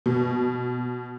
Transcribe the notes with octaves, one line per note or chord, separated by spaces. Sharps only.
B2